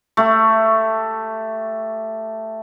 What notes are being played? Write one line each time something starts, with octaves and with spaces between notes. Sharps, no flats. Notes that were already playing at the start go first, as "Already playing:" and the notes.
A3 G4